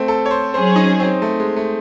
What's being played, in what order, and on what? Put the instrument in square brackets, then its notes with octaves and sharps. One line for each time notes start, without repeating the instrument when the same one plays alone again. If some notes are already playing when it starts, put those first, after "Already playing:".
Already playing: [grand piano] A3 C4
A4
C#5
C5
[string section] F#3 C#4 G#4 [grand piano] C5
[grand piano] D#4
C4
A3
G#3
A3